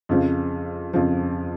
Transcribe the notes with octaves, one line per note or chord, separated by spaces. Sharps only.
F2 C#3 F3
F2 C#3 F3